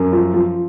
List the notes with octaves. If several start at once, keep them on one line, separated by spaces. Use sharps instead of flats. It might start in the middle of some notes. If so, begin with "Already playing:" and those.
Already playing: F#2
F3
F3